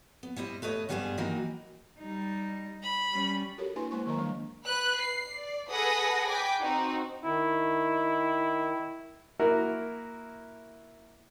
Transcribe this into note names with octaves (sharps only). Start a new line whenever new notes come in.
B3
G3 E4 C5 D#5
A3 B4 C#5 D#5
G2 G3 B3 G#4 A#4 C5
D#3 E3 F#3 A#3 D#4 F#4
G3 D#4
B5
G3 C#4
F#4 G4 A4 A#4 C#5
A#3 D4 E4 B4 G#5 C6
G#3 A#3 C5 C6 C#6
D#3 F#3 A#3 A#4 D#5 A#5
D#3 G3 D4 C#6
B4 F#6
C7
D5
G#4 A4 B4 F#5 D#6 A#6
B4 G5 G#5 D6
C4 D#4 F#4
D#3 E4
A#3 E4 F#4 A#4